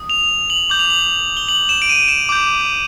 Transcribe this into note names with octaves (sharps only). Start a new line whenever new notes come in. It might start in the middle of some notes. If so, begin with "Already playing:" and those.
Already playing: D#6
F7
F#7
D6 G6 F#7
F7
F#7
G7
F#7
E7
D7
D#7
E7
D6 G6